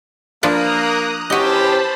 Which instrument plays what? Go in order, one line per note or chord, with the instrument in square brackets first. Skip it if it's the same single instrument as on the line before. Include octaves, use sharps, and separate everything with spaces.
[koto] F3 D4 B4 [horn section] A#3 [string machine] A#5 D#6 F#6
[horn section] E3 C#4 G4 [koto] F#4 D#5 [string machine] C5 A5 B5